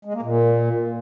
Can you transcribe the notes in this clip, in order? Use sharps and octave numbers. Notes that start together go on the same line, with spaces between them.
G#3
A#3
A#2